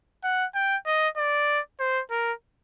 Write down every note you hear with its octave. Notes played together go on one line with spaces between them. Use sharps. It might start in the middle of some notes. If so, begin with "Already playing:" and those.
F#5
G5
D#5
D5
C5
A#4